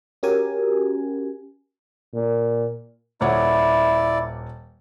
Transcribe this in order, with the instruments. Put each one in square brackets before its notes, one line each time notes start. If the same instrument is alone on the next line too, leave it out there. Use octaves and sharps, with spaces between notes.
[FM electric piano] C#4 F#4 G4 A#4 G#5
[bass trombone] A#2
[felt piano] D#1 C#5 F#5 [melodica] E4 D5